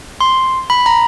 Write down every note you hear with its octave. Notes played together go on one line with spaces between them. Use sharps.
C6
B5
A#5